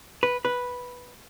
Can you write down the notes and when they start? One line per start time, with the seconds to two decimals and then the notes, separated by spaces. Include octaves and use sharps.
0.23 B4
0.45 B4